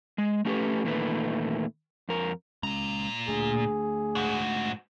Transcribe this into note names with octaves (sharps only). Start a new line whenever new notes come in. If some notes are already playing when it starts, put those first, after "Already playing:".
G#3
A3 C#4 D4 G4 A4 B4
E2 A#2 D#3 A3 B4
F2 A#4
A#2 G#3 C#4 A#5
A3 D4 G#4
G#2 F#4